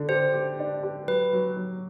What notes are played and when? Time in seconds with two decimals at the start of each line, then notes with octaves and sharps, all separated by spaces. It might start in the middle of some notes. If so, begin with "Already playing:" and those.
Already playing: D3
0.09 G4 C5
0.34 G4
0.59 D4
0.83 G4
1.08 F#3 B4
1.33 F#3
1.57 F#3